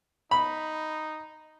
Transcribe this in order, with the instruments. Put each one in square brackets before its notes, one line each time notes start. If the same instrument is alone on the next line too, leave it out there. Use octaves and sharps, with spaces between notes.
[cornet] D#4 [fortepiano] B5